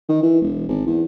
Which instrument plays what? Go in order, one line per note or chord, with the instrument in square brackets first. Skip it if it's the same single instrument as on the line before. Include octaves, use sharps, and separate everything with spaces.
[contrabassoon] D#3
E3
E1
G#1
E2